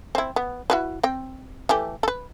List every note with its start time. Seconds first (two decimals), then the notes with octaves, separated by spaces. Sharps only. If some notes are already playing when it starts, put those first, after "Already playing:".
0.15 C4 E4
0.36 B3
0.70 E4 F#4 B4
1.03 C4 G5
1.69 E3 A3 G4
2.03 A4 B4